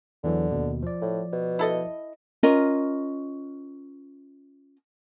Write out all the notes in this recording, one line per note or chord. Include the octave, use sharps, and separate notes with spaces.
E2 D3 E3 F#3
D#2 B2
F3 D5
A2
B2
E4 A4 D#5
C#4 F4 A#4 D#5